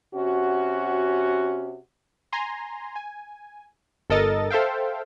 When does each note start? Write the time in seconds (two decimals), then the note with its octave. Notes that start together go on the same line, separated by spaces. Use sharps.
0.15 C3 C#4 F#4
2.33 G#5 A#5 C6
2.96 G#5
4.10 G1 A4 A#4 D#5 A6
4.50 A4 C5 E5 F5 G5